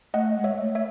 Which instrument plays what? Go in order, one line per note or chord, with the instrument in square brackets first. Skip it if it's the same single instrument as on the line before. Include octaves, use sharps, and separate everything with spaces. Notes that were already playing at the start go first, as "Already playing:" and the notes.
[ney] A3 [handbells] D#5 F#5
[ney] G#3
[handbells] C#5 E5
[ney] A3
[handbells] C#5 E5